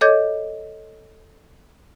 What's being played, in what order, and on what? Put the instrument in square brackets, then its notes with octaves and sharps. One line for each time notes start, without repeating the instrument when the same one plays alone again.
[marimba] A4 C#5 D#5 D6 G6 G#6